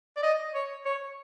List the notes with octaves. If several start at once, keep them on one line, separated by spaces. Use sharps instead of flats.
D5
D#5
C#5
C#5